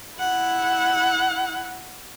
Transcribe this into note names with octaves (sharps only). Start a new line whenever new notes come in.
E4 F#5